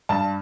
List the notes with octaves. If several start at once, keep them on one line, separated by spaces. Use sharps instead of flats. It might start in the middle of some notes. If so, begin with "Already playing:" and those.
G2 A5